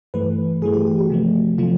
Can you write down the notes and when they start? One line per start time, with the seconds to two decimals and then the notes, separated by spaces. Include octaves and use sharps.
0.14 G2 E3 A3 B4
0.62 G2 E3 A3 G#4
0.73 G4
0.87 G4
0.99 F#4
1.10 C3 F3 A3
1.58 C3 F3 A3 F4